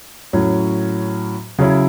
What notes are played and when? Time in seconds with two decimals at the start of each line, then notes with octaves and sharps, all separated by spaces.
0.33 A2 F#3 C#4
1.59 C#3 F#3 C#4 E4